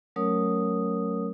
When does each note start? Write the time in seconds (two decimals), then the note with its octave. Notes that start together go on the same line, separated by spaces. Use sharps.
0.16 F#3 A3 C#4 A#4 C#5 D#6